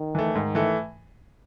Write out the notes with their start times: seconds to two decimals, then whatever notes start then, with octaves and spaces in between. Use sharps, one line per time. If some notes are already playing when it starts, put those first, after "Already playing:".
Already playing: D#3
0.15 E3 A3
0.35 G#2 D#3
0.55 E3 A3